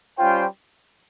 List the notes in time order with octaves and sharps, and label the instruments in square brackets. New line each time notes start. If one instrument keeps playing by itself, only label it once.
[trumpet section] G3 C#4 F4 C5 G5